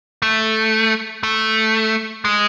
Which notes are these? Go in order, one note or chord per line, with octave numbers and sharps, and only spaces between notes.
A3
A3
G#3